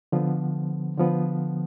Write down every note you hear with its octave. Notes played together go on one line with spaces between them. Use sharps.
D3 F3 B3
D3 F3 B3